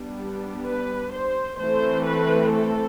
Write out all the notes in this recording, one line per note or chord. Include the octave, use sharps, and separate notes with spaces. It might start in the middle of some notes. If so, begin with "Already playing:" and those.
Already playing: G3 B3 D4
B4
C5
E3 A3 C4 C5
B4
A4